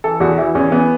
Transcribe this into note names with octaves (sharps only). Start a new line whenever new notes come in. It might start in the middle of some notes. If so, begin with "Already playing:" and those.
E3 A4
E2 F#4
E3 E4
E2 C#4
E3 B3